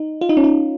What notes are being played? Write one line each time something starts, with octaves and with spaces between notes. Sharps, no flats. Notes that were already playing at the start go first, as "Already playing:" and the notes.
Already playing: D#4
F4
D#4
C#4
D#4